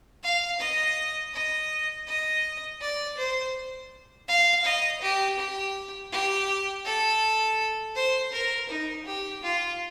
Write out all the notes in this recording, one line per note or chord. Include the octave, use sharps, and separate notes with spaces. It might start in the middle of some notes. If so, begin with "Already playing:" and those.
F5
D#5
D#5
D#5
D5
C5
F5
D#5
G4
G4
G4
A4
C5
A#4
D#4
G4
F4